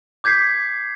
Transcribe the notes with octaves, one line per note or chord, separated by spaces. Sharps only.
D6 G6 G#6 B6 C7